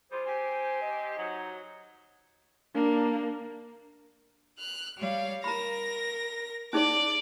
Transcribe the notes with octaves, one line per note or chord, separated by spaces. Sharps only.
G3 F4 G#4 C5
C4 G4 G#5
D#5
F#3 D#4
A#3 D4
F6 F#6
G3 C#5 F5
A#4 A#5 B5 A#6
C#4 D#4 G#4 D5